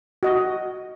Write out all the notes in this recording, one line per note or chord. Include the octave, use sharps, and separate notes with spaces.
F#4 D#5